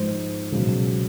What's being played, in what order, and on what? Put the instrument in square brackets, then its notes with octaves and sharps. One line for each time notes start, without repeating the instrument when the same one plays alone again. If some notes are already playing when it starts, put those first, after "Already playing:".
Already playing: [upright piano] G#2 F3 G#3 C5
C#2 B2 F#3